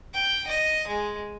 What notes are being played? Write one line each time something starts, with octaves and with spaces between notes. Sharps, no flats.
G5
D#5
G#3